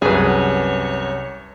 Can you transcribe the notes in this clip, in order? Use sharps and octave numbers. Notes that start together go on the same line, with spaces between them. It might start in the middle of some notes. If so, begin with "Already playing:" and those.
C2 F#2 G#4 B4 C#5